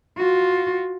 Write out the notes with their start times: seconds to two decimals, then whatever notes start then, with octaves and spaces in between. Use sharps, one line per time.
0.17 F4 F#4